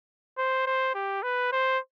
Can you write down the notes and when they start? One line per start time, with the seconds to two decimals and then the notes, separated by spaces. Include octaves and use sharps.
0.38 C5
0.66 C5
0.94 G4
1.23 B4
1.52 C5